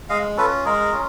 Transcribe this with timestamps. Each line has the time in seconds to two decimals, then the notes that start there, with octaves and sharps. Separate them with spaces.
0.09 G#3 D#5 F5
0.37 C#4 F4 A4 B4
0.65 G#3 G#4 A#4
0.92 C#4 F4